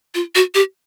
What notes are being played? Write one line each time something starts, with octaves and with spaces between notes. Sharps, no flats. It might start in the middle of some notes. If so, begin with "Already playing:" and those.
F4
F#4
G4